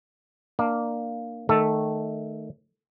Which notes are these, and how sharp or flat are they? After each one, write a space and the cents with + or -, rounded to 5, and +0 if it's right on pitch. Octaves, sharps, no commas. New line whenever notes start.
A#3 +0 D4 +25
D#3 -15 A3 +0 A4 +0